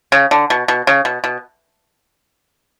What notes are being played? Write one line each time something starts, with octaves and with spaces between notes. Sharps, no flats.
C#3
D3
B2
B2
C#3
B2
B2